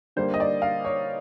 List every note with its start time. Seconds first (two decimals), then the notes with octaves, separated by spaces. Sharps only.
0.16 D3 G3 A#3 C5
0.34 D#5
0.40 D5
0.62 F5
0.85 C#5